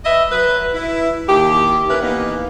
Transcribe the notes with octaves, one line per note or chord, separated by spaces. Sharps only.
B4 D#5 E5
F#3 B4
E4
D#2 G4
C#4 E4 A#4 B4
E3 A#3 B3 D#4